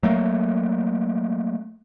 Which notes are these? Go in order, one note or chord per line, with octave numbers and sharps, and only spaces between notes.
F#3 A3 A#3